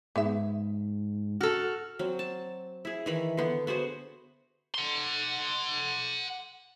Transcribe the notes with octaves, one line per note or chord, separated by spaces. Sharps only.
G#2 B3 G#4 E5
F#4 A4 F6
F#3 C4
A5
E4 G#4
D#3 E3 B5
D3 B3
B3 F#4 G#4 C5
F#5 C6